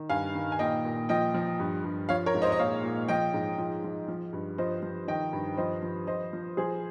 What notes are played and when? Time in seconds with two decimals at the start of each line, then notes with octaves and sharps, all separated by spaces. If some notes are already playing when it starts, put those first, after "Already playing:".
Already playing: D#3
0.09 G2 F5 G#5
0.35 D#3
0.52 G#5
0.59 A#2 D#5 G5
0.85 A#2
1.09 F3 D#5 G5
1.34 F3
1.60 G2
1.84 G2
2.09 F3 C#5 F5
2.26 A#4 C#5
2.34 G#2
2.42 C5 D#5
2.52 D#5
2.59 A#2 C#5 F5
2.83 A#2
3.08 F3 D#5 G5
3.34 G#2
3.58 F3
3.84 F3
4.08 F3
4.33 G2
4.58 F3 C5 D#5
4.83 F3
5.07 D#3 D#5 G5
5.33 G2
5.57 F3 C5 D#5
5.82 F3
6.07 F3 C5 D#5
6.33 F3
6.57 F3 G#4 C5